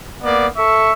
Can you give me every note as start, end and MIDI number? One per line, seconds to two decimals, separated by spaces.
0.23 0.47 58
0.23 0.47 59
0.23 0.47 74
0.57 0.93 69
0.57 0.93 76
0.57 0.93 85